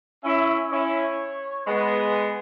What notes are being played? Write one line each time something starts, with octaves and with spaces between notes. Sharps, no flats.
C#4 E4 E5
C#4 E4 C#5
G#3 B3 B4